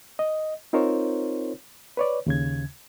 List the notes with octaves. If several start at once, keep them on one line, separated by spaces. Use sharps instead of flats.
D#5
C4 D#4 F4 A#4 C5 C#5
B4 C#5 D5
D#2 C#3 G#6